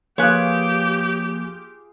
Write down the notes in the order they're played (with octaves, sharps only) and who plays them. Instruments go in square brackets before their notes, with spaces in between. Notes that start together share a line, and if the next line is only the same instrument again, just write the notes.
[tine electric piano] F3 A#3 G#5 [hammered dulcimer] F4 G#4 [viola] G4 [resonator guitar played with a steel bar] B4 C#5